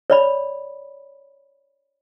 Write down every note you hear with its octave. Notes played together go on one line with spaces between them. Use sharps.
C#5 D5 B5